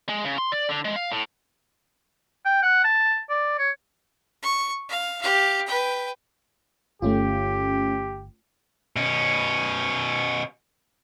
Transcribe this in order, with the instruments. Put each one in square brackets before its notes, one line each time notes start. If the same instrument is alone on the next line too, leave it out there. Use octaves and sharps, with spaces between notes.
[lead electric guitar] G#3
C#3
C6
D5
D3
G#3
F5
A2
[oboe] G5
F#5
A5
D5
C#5
[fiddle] C#6
F5
G4 F5
B4 G5
[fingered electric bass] G1 [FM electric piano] A3 C#4 F4 [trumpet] G4
[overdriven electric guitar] B2 C#4